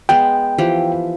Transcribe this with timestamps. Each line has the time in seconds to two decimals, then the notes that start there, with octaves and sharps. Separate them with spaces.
0.09 G#3 B3 G5
0.58 E3 F3 G4